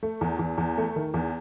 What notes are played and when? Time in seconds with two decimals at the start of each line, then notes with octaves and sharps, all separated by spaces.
0.03 A3
0.21 E2
0.39 E2
0.58 E2
0.77 A3
0.96 D#3
1.14 E2